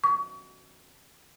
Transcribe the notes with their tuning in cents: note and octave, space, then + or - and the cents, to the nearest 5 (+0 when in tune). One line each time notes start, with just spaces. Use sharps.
C#6 +40